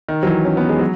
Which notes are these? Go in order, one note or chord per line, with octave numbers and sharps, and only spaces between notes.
D#3
F#3
E3
C#4
B3
G#3
F#3